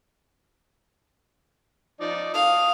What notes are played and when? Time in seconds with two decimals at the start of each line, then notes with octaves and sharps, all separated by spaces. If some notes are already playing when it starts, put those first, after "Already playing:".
2.00 F3 D#4 D5
2.34 A4 F5 D#6